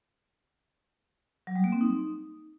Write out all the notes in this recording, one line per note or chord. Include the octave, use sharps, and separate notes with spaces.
F#3
G3
A#3
C4
D#4